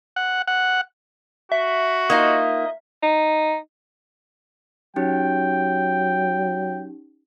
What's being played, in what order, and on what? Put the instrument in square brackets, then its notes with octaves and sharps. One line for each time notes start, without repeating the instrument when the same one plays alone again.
[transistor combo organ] F#5
F#5
[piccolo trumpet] F#4 [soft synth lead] E5
[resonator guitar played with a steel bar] A#3 D#4 F4 [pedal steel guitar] D#5
[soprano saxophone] D#4
[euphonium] F#3 [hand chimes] C#4 D#4 G4 [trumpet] G5